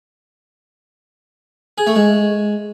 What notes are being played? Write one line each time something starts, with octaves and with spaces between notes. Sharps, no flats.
G#4
A3
G#3